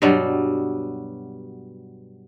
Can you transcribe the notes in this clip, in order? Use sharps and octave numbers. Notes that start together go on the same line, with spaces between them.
G2 B2 F#3 G3